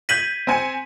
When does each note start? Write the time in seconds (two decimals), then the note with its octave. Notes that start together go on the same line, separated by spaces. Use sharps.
0.09 G6 G#6 A#6 B6 D#7 F#7
0.47 C4 G#5 C#7